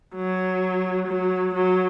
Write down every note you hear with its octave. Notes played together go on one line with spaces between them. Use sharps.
F#3
F#3
F#3